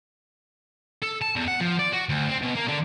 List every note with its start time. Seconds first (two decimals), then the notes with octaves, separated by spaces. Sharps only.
1.03 A4
1.22 A5
1.36 E2
1.48 F#5
1.61 F3
1.79 D5
1.93 F#4
2.09 D2
2.29 C4
2.42 B2
2.56 A#3
2.68 D3